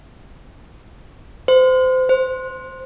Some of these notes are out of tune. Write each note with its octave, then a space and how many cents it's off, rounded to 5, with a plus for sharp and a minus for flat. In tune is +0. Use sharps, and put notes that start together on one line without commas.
C5 -25
C5 +5